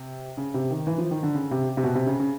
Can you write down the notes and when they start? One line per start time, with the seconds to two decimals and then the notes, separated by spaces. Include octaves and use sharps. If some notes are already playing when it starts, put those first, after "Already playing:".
Already playing: C3
0.37 C#3
0.54 C3
0.71 D#3
0.87 E3
0.98 F3
1.11 D#3
1.23 D3
1.35 C#3
1.51 C3
1.77 C3
1.83 B2
1.95 C3
2.06 C#3
2.20 C#3